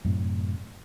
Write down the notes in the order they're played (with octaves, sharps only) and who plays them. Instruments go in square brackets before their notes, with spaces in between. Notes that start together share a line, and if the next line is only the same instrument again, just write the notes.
[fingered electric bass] F#2 A2 C3